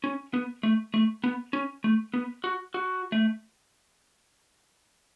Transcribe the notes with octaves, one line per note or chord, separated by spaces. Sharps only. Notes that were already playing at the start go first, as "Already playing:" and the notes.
C#4
B3
A3
A3
B3
C#4
A3
B3
F#4
F#4
A3